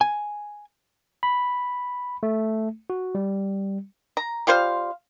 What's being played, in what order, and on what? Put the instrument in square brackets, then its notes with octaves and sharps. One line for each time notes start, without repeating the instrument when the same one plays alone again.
[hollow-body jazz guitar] G#5
[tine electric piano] B5
A3
F#4
G3
[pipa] A#5
G3 F4 C5 F5